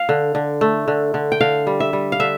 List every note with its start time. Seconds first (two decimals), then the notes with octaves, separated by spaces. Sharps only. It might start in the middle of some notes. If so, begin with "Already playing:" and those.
Already playing: F5
0.09 D3
0.35 D3
0.61 A3
0.88 D3
1.14 D3
1.32 G5
1.41 D3 F5
1.67 G3
1.80 E5
1.93 G3
2.12 F5
2.20 D3 E5